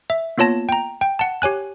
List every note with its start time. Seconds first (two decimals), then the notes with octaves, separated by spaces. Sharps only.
0.10 E5
0.38 A#3 B3 F4 C#5 A5 A#6
0.69 G5 A#5
1.01 G5
1.19 F#5 A5
1.42 G4 C#5 G#5 F#6